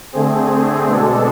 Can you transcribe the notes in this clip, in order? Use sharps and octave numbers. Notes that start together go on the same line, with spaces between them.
D3 A3 C4 G#4
B2 G#3 D4 A4